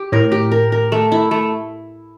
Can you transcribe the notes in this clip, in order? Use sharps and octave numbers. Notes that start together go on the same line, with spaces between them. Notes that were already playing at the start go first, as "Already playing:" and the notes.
Already playing: G4
A2 A#4
G4
A#4
A#4
A3
E4
A3